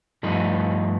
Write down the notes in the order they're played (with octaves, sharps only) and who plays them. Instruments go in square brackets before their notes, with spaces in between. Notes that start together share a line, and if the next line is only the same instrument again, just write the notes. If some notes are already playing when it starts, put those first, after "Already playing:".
[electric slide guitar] G2 F3 A3 D#4